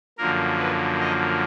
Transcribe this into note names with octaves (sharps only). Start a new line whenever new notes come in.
F#2 D3 F3 A#3 A#4
B4
D#5